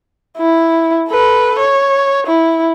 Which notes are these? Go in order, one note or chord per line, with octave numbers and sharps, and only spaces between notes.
E4
A4 B4
C#5
E4